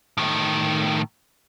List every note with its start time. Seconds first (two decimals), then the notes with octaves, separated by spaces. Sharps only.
0.17 A2 D#3